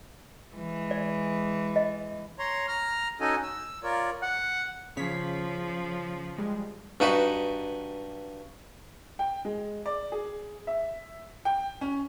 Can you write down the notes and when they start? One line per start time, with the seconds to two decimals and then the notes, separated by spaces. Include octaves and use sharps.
0.54 E3 G#3
0.91 D5
1.76 D#5
2.39 C#5 A#5 C6
2.68 A#5 F6
3.20 C#4 D#4 F#4 A4 D#5 G#5
3.43 E6
3.83 F4 A#4 C#5 D5
4.23 F#5
4.97 C#3 F3 C#5 B6
6.38 G3 G#3
7.00 G2 D#4 F#4 B4
9.19 G5
9.45 G#3
9.86 D5
10.12 G#4
10.67 E5
11.45 G5
11.81 C#4